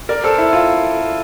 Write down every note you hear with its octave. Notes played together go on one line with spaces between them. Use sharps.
A#4 D5
A4 C5
E4
F4